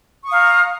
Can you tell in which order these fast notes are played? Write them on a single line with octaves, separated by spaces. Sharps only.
C#6 D#6 F5 A#5